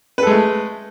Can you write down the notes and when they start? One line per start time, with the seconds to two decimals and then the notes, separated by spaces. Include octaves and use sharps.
0.18 B4
0.22 A4
0.27 G#3
0.31 A3